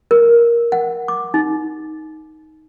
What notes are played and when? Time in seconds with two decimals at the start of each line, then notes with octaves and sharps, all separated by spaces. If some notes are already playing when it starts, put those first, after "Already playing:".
0.11 A#4
0.72 F#5
1.08 D6
1.34 D#4